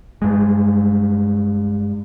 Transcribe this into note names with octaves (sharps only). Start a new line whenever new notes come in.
G2 G#3